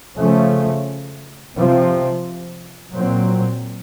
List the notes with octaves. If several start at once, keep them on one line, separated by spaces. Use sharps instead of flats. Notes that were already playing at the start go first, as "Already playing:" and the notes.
C#3 F3 A3 C#4
C3 F3 C4
A#2 F#3 C4